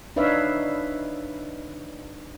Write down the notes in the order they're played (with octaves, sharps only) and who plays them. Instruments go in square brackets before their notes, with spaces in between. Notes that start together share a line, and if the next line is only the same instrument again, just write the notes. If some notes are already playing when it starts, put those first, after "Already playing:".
[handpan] D4 D#4 B4 C#5 E5 F5